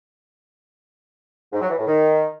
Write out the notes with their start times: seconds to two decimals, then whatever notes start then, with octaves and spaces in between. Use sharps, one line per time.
1.53 G#2
1.61 F#3
1.70 E3
1.78 A2
1.87 D#3